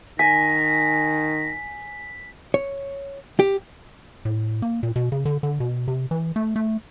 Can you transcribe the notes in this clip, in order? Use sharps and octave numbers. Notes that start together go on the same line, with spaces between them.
D#3 G#5 A#6 B6
C#5
G4
A2
A#3
A#2
B2
C#3
D3
D3
B2
C3
E3
A3
A3